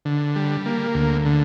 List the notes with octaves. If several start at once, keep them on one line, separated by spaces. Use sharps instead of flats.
D3
G3
A#3
D2
D3